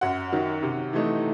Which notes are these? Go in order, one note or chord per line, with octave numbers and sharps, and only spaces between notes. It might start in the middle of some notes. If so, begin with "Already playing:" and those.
F#2 F#5
D#3 F#3
C3
E3 A3 D#4